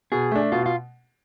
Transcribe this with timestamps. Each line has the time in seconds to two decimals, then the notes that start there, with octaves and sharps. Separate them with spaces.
0.12 B2 G#4
0.32 A3 D4
0.52 B2 F4
0.66 F4